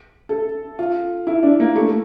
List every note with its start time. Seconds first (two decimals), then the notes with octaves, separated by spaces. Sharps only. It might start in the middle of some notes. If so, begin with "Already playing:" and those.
0.29 A4
0.79 F4
1.27 E4
1.43 D4
1.60 A#3
1.76 A3
1.87 A3